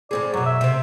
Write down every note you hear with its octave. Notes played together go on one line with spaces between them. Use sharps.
A2 C4 G#4 D5
F#2 B2 F#3
E5
C3 C4